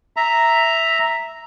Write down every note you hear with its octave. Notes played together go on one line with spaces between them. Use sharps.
E5 A#5